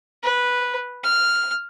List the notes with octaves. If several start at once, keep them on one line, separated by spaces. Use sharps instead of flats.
B4
F6